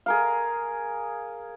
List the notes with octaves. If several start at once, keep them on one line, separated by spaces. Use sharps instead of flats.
G#4 A#4 F5